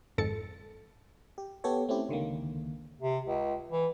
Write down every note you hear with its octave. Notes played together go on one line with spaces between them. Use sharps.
G#1 F2 G#2 A4 A6 C#7
G4
B3 G4 A4 C#5
A3 C4 C#4 E4 G4
C#2 D3 D#3 A#3
C3
C#2
E3